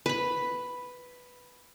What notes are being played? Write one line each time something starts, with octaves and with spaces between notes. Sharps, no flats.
B4 B5